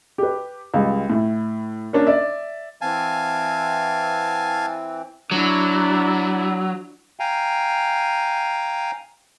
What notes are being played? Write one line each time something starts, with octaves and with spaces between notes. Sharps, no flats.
G4 B4
C#2 G3 G#3
A2 E4
A#3 C#4 D4
D5 E5
E3 C4 F5 G#5 A5
F#3 D4 E4
F5 G5 G#5 A#5